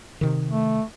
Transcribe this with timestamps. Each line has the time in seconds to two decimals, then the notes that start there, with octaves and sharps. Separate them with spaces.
0.21 C3 D#3
0.49 A3